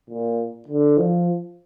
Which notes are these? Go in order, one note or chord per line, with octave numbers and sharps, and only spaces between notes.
A#2
D3
F3